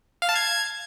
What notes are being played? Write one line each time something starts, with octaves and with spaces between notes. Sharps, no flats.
F5
A5
G#6